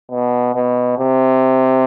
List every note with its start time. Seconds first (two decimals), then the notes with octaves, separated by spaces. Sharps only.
0.11 B2
0.55 B2
0.98 C3